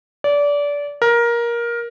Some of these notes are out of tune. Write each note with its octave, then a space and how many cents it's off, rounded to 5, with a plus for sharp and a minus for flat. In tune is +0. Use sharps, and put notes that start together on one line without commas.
D5 -25
A#4 +15